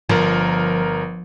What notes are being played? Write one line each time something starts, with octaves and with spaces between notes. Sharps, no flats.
G1 F3 A#4